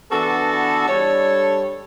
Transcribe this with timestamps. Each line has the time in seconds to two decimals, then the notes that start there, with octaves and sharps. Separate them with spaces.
0.11 E3 B3 D4 F#4 A4
0.88 G3 D4 A4 C#5